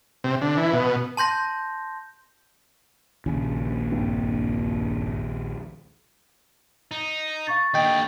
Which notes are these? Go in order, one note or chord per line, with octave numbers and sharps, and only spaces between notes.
C3
D3
E3
B2
A5 C6 G6 A#6
A#1 D#2 C#3
F#1 G2 C4
D#4
F5 C#6 A6
D#2 D3 D#5 G5